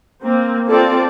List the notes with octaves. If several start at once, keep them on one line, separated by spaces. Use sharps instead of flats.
A#3 C4
C4 F4 A4 D5